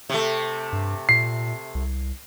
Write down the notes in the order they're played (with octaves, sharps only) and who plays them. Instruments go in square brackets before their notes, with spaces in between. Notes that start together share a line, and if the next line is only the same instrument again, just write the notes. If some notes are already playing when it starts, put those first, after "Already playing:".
[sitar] C3 A3
[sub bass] G2
[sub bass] A#2 [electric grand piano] C7
[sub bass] C2